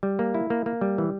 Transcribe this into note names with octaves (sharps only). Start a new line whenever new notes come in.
G3
A#3
E4
A#3
A#3
G3
E3